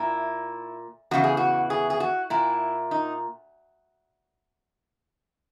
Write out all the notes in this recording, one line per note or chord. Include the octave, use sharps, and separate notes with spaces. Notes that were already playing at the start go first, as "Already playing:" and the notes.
Already playing: A#2 E4
E2 C#3 E3 F#4
G#4
F#4
G#4
G#4
F#4
A#2 E4
D#4